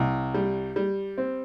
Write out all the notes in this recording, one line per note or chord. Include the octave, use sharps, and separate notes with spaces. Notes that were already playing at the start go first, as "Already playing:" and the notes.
Already playing: C2
G3
G3
C4